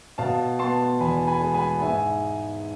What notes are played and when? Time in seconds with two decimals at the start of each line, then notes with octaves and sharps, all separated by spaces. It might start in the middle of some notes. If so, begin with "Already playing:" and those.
0.18 B2 F5 A5
0.59 B3 A5 C6
1.00 E2 G#5 B5
1.27 G#5 B5
1.40 G#3
1.54 G#5 B5
1.82 G#2 E5 G#5